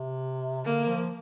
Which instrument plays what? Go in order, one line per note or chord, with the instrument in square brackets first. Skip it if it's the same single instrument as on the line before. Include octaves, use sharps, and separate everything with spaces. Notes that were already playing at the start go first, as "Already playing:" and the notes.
Already playing: [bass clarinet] C3
[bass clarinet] D3 [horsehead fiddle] A#3
[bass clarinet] F3